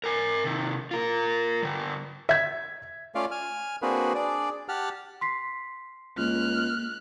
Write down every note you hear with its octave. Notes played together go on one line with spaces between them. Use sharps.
A#4 G#5
C3 D#3
F4 A#4
D3 G3
E5 G#6 B6
A3 C#4 F4 D5 F5
G#5 F6
A#3 C4 D4 F#4 G#4 B4
D4 G#4 D5
G4 F#5 A5 F6
C6 B6 C7
C#2 A#3 F6 F#6